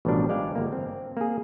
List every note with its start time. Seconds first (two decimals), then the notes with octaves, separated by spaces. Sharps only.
0.05 A1 B2 F3 G3 D4 A#4
0.29 G#3 D5 F5 G5
0.55 G1 A#3
0.72 C4
1.17 A#3 G#4